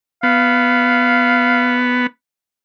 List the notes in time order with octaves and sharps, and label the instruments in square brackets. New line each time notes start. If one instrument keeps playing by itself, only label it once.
[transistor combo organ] B3 [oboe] F5